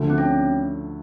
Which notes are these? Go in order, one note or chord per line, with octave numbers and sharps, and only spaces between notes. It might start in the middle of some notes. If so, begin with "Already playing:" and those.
Already playing: D2 D3 F3 A3
C4
C#4